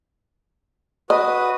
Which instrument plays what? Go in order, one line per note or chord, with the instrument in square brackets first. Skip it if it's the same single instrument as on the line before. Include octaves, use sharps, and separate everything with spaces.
[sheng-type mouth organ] F#4 B4 D#6 [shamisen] D#5